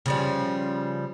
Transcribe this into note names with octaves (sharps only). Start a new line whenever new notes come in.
C#3 F3 G3